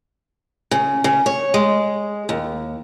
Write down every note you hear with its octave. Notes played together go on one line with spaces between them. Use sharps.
C#3
C#3
C#5
G#3
D#2